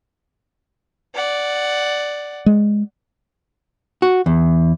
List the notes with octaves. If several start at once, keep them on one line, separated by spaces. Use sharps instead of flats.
D5 F#5
G#3
F#4
E2